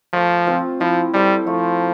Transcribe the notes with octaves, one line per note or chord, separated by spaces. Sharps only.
F3 A3
C4 F4
F3 E4
G3 A4 C5 E5
F3 A3